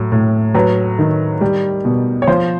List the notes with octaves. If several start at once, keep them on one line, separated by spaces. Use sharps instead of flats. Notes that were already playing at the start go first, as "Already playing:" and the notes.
Already playing: A2 F#3
A2
F#3 B4
D#3
G3
B2
C#5
F3 C5